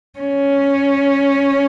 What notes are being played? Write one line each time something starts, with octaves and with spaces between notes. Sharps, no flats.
C#4